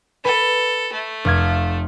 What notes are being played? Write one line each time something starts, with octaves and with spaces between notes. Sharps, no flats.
A4 B4
A3
F1 F5 G#6